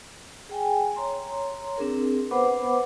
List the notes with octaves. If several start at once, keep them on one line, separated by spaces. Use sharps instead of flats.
G#4 G5 G#5
C#5 A#5 C6
C4 D4 G#4 A#4
B3 B4 C5 F#5 B5 D6